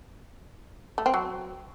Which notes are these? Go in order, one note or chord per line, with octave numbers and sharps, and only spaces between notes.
A3
C4
F#3